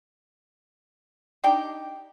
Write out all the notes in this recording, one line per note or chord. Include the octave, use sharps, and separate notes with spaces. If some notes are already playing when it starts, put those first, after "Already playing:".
D4 D#4 G4 G5